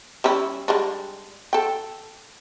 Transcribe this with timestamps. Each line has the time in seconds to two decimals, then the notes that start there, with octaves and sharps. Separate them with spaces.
0.24 G3 C#4 E4
0.68 G3 G#3 D4
1.53 A4 G5